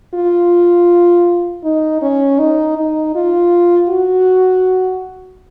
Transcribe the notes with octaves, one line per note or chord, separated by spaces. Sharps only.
F4
D#4
C#4
D#4
D#4
F4
F#4